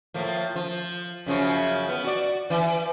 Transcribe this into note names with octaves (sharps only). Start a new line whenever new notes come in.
A2 F3 A#3
F3
F#2 C#3 F3
B3
F#4 D5
E3